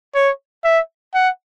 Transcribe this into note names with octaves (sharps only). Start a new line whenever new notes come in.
C#5
E5
F#5